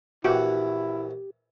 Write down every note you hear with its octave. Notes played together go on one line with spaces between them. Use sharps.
A#1 E3 E4 F#4 G4